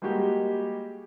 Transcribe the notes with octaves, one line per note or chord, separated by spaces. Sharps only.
G3 G#3 A#3 F#4 G4